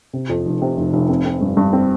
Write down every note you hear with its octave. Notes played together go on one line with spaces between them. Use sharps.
C3
F2
F1
C3
F1
F1
C4
C4
G2
G2
C4